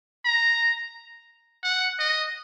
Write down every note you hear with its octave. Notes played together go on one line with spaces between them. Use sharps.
A#5
F#5
D#5